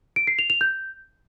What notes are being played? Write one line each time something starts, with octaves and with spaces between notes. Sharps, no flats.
D7
C7
F7
F7
G6